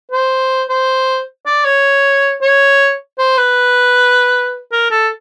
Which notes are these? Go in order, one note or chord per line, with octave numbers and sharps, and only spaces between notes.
C5
C5
D5
C#5
C#5
C5
B4
A#4
A4